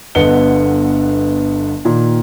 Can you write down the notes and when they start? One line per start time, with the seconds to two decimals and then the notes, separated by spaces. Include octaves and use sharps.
0.15 G1 D3 B3 D#5 C#7 G7
1.85 A#2 D#3